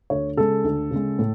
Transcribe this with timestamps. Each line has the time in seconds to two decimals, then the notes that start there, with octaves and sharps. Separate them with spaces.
0.10 D2 C#5
0.37 C#3 G#3 A4
0.64 D2
0.91 C#3 G#3
1.19 A2